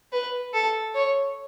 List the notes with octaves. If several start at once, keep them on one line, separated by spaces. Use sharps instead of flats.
B4
A4
C#5